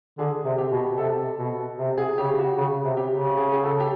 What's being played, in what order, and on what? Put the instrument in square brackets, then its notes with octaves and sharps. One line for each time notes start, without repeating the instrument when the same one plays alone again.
[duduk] D3 [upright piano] G#4
[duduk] C3
[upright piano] G4
[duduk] B2
[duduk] C3 [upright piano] A4
[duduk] B2
C3
[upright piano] G#4
[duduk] C#3 [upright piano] G4
[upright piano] F#4
[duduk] C#3
C3
[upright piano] G4
[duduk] C#3
[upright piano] G#4
G#4
A4
G4